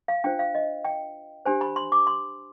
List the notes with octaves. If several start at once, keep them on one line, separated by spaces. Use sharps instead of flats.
F5
D4 F4 C5 G5
F5
D#5
G5
D4 G4 C5 G#5
B5
C6
D6
C6